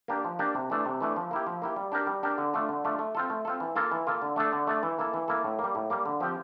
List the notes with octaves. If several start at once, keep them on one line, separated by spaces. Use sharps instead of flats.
A#3 D4 G4 A#4
F3
A#3 D4 G4 A#4
C3
E3 A3 D4
C3
E3 A3 D4
F3
A#3 E4 G4
F3
A#3 E4 G4
G3
D4 G4 A#4
G3
D4 G4 A#4
D3
A3 D4 F4
D3
A3 D4 F4
A3
C4 F4 A4
A3
C4 F4 A4
E3
A#3 F4 A4
E3
A#3 F4 A4
D3
A3 D4 A4
D3
A3 D4 A4
E3
A#3 E4 A4
E3
A#3 E4 A4
A2
A#3
G3
A2
G3 A#3
D3
F3 C4 G4